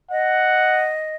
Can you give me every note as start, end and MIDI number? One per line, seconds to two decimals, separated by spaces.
0.11 1.16 75
0.11 0.94 78